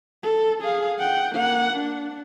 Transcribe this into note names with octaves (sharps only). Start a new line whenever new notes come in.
A4
G#4 F5
F#5 G5
A#3 F#5
D4